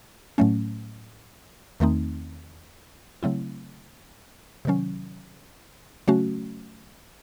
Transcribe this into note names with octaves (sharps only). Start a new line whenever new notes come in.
A2 F#3 A3 C#4
E2 D#3 A3 C4 D#4
C#3 F#3 A3 C4 E4
C3 D#3 F#3 C#4
C#3 F#3 A3 C#4 F#4